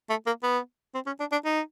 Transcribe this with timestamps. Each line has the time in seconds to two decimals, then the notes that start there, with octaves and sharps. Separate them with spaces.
0.10 A3
0.26 A#3
0.43 B3
0.94 C4
1.06 C#4
1.20 D4
1.32 D4
1.45 D#4